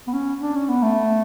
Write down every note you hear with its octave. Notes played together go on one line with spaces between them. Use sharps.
B3
C#4
D4
C#4
B3
A3